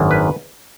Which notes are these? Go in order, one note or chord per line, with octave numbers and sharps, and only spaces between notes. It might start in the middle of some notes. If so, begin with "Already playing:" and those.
Already playing: G#1 F#2 D#3 A#3 D4
B4